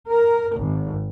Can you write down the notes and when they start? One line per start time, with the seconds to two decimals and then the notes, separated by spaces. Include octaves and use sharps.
0.11 A#4
0.58 G#1